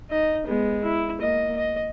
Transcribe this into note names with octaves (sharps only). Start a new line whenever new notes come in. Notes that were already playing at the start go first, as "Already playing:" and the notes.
D#4 D#5
G#3 B3
E4
A#3 D#5
D#5